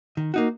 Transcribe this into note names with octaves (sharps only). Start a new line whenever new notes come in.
D#3
A#3 D#4 F#4